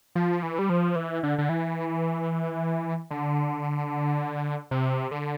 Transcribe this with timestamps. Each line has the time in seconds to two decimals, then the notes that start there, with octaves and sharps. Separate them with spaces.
0.15 F3
0.42 E3
0.59 G3
0.70 F3
0.96 E3
1.23 D3
1.38 D3
1.49 E3
3.11 D3
4.71 C3
5.11 D3